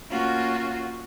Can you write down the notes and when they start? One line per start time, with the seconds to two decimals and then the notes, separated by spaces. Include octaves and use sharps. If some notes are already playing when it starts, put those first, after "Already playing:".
0.11 A#3 C#4 F4 F#4